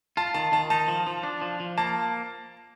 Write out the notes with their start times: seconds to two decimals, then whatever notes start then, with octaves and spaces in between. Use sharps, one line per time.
0.17 F4 A5
0.34 D#3 A5
0.52 D#3 A5
0.70 D#4 A5
0.88 F3
1.07 F3
1.23 D4
1.42 F3
1.60 F3
1.78 A#3 A5